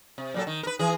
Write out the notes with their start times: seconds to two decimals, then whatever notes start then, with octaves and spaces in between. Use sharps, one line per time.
0.18 C3
0.34 A#2 F#3 A4
0.47 D#3
0.63 A#4 B4
0.79 E3 G#4